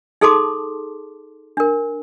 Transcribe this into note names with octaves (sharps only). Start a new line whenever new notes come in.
D#4 G#4 A4 A5 C6 D6
D4 A#4